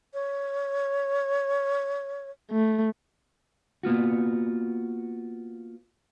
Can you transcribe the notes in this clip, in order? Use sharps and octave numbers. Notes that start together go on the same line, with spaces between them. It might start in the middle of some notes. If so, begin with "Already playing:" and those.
C#5
A3
A#3 B3 F4 F#4